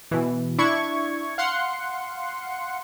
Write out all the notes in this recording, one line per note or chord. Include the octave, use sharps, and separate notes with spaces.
B2 E3
D4 E4 C#6 G#6
F5 F#5 C6 C#7